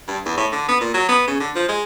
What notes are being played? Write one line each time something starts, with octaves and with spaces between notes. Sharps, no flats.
G2
E2
A2
D3
B3
A#2
F#3
B3
C#3
D3
F3
G#3